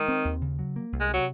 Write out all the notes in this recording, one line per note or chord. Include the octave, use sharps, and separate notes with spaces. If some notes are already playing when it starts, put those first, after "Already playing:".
Already playing: D#3 G#3
C4
D#2
C#3
F#3
A#3
C2
G#3
C3 F#3